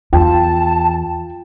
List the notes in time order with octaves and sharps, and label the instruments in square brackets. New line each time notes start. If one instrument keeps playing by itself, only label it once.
[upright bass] E2 [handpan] F4 [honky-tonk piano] G5 [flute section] A5